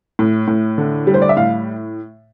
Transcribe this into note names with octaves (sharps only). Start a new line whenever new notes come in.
A2
A2
D3
G3
C5
D5
E5
A2 F5